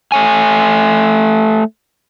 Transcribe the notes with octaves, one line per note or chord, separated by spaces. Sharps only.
A3 C#5 G#5